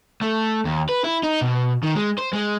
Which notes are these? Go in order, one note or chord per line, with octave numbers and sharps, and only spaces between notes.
A3
D#2
B4
E4
D#4
B2
D#3
G#3
C5
G#3